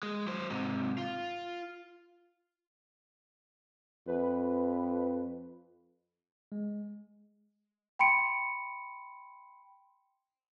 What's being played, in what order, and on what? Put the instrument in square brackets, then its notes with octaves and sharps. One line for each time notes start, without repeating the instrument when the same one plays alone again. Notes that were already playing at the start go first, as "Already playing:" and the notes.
[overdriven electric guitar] G#3
F#3 C5
G#2 C3
F4
[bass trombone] F2 [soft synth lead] B4
[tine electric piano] G#3
[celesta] G5 B5 C6 C#7 D7